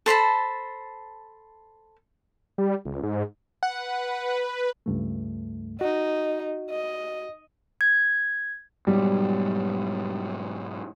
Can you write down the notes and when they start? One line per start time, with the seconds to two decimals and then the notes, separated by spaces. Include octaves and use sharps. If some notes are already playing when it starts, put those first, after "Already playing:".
0.06 A4 C5 A5 B5
2.58 G3
2.85 C#2
3.03 G#2
3.63 B4 F#5
4.86 C#2 G2 A3
5.81 D#4 F#4
6.70 D#5
7.81 G#6
8.87 G#2 B2 F#3 G3